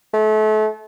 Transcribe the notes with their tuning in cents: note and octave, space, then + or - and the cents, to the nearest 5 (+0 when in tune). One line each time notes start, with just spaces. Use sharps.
A3 -35